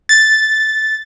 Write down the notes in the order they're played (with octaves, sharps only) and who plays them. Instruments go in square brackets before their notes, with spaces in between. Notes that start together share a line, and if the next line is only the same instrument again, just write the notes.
[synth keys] A6